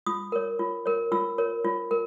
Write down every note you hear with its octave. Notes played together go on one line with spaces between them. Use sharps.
F4 D#6
A#4 C#5
F4
A#4 C#5
F4 E6
A#4 C#5
F4
A#4